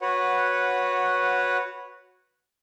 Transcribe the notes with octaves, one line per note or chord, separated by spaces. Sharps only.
F#4 B4 C#5 F#5